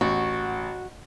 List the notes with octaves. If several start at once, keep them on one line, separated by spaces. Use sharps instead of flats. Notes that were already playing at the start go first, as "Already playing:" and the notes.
A1 F#4